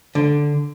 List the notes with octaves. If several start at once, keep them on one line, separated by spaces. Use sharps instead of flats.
D3